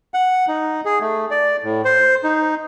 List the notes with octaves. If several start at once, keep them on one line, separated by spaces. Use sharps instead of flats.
F#5
D#4
G#4
A3
D5
A2
C5
D#4